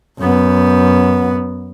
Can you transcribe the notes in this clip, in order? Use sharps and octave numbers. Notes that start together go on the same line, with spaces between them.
F#2 B3